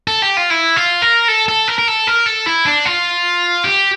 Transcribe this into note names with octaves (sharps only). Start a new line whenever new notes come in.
A4
G4
F4
E4
F4
A#4
A4
A4
A#4
A#4
A4
A#4
A4
E4
D4
F4
G4